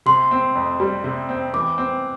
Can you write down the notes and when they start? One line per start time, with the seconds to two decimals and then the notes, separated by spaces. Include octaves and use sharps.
0.06 C3 C6
0.31 C4
0.55 F2
0.80 G3
1.04 C3
1.29 C4
1.53 E3 D6
1.78 C4